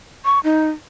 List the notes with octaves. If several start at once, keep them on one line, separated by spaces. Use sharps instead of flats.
C#6
D#4